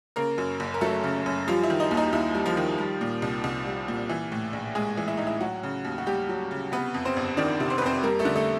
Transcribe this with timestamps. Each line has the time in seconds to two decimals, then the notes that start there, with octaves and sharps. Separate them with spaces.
0.16 C#3 A#3 A#4
0.38 F#2
0.60 F#1
0.74 A#4
0.81 F#3 A3 A4
1.03 C#3
1.26 F#2
1.48 F3 G3 F4
1.63 E4
1.70 D#3
1.80 D#4
1.91 D#2
1.97 D#4
2.13 D#2 E4
2.35 G3
2.46 F3 F4
2.57 D#3
2.78 G3
3.01 A#2
3.22 C2
3.44 C2
3.66 G3
3.88 A#2
4.09 E3
4.32 A2
4.53 A#1
4.75 G#3 G#4
4.97 E3
5.08 E4
5.17 A2 D#4
5.27 E4
5.40 F#3 F#4
5.63 C#3
5.85 D#2
5.98 F#4
6.06 D#2 G3 G4
6.29 F#3
6.51 C#3
6.72 C3 B3 B4
6.94 F2
7.05 C4 C5
7.16 G1
7.37 D#3 D4 D5
7.60 C3
7.70 C5
7.78 B4
7.82 F2 C4 C5
8.03 G3 A#3 A#4
8.19 A3 A4
8.25 D3
8.36 A3 A4